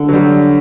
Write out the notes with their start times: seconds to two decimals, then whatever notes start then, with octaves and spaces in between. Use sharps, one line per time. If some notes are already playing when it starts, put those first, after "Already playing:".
Already playing: D3
0.09 F#3
0.13 G3